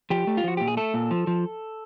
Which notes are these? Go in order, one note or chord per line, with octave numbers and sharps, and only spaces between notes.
F3 G4
A3
F4
F3 F#4
A#2 G4
G#4
A3 A4
A#2
F3
F3